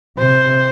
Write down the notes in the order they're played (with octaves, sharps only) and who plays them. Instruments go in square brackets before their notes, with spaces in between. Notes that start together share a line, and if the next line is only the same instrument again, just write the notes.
[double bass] C3 [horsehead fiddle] C5